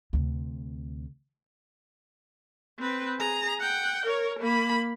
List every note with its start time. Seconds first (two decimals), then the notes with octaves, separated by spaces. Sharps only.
0.13 D2 C3
2.79 C4 B4
3.18 G#4 A#5
3.59 F#5 G5
4.06 A#4 C#5
4.39 A#3 B5